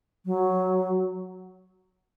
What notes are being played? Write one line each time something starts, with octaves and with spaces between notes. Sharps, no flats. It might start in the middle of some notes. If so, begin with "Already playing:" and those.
F#3